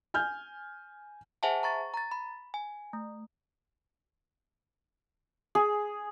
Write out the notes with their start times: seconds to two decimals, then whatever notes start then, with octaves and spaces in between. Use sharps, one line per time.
0.14 G#5 F6 G6
1.43 G#4 C5 E5 F#5 G#5 A5
1.63 A#5 C#6 A6
1.94 A#5 A6
2.11 B5
2.54 G#5
2.93 A3
5.55 G#4